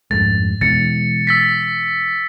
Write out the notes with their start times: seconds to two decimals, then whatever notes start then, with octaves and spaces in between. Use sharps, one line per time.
0.11 F2 G#2 A3 A6
0.61 B2 E3 G#3 A6 C#7
1.27 E6 A6 B6